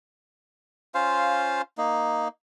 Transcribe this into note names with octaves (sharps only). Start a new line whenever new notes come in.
C#4 F4 C5 F5
A#3 D#4